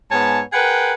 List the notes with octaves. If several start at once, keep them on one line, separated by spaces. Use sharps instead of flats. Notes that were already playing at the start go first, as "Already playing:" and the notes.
G#2 B3 C#5 G#5 A5
G#4 A#4 B4 F#5 G5